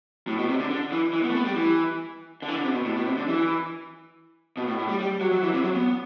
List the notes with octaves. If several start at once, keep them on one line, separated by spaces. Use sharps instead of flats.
A2
B2
C3
D3
D3
E3
E3
B3
A3
B3
G3
E3
D3
E3
D3
C3
B2
A2
B2
C3
D3
E3
B2
A2
A2
G3
G3
F#3
F#3
E3
C3
F#3
B3